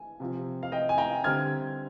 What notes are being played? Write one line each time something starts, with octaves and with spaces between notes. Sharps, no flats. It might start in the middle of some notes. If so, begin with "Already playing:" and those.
Already playing: G#5
C3 F3 C4
F5
D#5 G5
G#5
G5 A#5
D3 G3 C4 F6 G#6